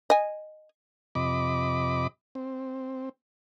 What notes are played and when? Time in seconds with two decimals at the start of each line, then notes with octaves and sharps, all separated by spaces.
0.10 D#5 G#5
1.15 F2 C3 D#5 B5 D6
2.35 C4